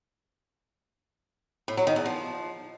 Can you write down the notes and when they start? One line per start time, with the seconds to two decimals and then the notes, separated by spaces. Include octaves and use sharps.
1.68 A2
1.77 F#3
1.87 D#3
1.96 E2
2.06 F3